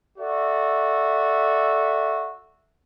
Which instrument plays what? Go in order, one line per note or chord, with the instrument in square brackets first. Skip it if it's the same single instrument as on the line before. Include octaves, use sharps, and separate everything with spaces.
[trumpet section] F#4 A4 D5 E5